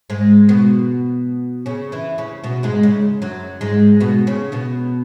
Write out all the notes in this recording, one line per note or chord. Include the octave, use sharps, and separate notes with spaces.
G#2 G#3
B2 B3
C#3 C#4
E3 E4
C#3 C#4
B2 B3
G#2 G#3
C#3
F#2 F#3
G#2 G#3
B2 B3
C#3 C#4
B2 B3